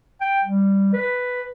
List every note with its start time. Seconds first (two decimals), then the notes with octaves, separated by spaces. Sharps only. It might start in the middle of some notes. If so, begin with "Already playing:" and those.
0.21 G5
0.44 G3
0.93 B4